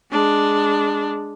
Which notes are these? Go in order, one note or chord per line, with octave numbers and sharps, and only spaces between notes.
G#3 D4